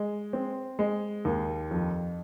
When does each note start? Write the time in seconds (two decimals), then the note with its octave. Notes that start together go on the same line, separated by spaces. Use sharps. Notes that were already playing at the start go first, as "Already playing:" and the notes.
Already playing: G#3
0.33 C4
0.79 G#3
1.25 D#2
1.71 F2